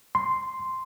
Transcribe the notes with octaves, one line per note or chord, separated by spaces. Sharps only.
C6